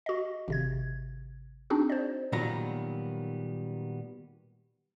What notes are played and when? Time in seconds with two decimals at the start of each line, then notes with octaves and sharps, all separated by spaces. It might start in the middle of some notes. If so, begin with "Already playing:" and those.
0.06 F#4 D#5
0.48 G#1 C3 G#6
1.70 C4 D4 D#4 F#4 G#4
1.89 C5 D5
2.32 A#2 D#3 F#3 G3 B3 A#5